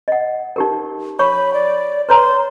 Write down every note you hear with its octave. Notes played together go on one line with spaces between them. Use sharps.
D#5 F#5
D#4 G4 A#4
C#5 B5 C#6
D5
B4 C#5 A#5 C6